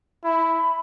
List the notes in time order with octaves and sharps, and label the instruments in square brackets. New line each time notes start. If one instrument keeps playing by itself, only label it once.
[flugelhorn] E4 [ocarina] B5